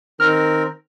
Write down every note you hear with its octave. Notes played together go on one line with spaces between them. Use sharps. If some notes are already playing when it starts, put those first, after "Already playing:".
D#3 C4 A#4 F6